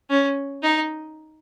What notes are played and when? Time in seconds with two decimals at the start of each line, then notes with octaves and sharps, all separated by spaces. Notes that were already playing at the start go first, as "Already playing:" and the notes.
0.10 C#4
0.63 D#4